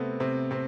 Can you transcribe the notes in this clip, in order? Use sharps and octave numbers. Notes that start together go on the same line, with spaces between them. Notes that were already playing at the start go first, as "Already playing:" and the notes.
Already playing: C3 A3 B3 C4
C3 C4
C3 C4